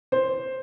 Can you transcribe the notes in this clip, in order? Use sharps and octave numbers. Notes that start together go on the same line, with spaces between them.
C5